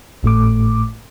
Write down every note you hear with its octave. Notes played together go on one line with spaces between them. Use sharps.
G#1 A2 A3 D6